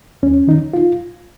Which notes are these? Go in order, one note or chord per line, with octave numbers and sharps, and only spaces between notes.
D#2 C#4
D#3 D#4
F4